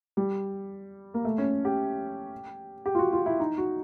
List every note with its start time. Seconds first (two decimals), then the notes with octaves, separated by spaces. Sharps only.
0.17 G3
1.14 A#3
1.25 A3
1.38 C#4
1.65 G4
2.86 G4
2.95 F4
2.99 F#4
3.12 F4
3.26 E4
3.40 D#4
3.58 F#4